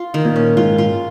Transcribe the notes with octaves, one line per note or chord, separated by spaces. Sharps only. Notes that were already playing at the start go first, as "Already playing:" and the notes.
Already playing: F4
D#3
A#2
C#4
G#2 F4
F4